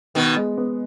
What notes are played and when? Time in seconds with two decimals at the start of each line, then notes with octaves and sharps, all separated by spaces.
0.15 B2 D#3 B3
0.36 G#3
0.58 B3